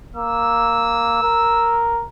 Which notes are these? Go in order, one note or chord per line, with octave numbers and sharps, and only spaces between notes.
A#3 E6
A#4